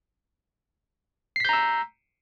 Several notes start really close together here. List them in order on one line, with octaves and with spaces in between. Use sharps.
C7 B6 G6 A#5 E6